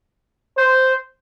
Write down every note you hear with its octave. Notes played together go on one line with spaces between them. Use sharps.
C5